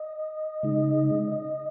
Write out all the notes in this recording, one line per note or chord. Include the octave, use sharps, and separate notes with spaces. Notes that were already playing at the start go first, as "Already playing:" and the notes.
Already playing: D#5
C#3 G#3 D#4
D#5